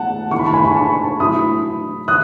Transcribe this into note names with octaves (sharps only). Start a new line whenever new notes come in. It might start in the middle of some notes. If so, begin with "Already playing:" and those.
Already playing: A3 F#5 A5
D#3 A3 E4 C#6
B5
A5
G#5 B5
B5
A5 C#6
F#3 A3 E4 B5 D#6
D#3 D#6 F#6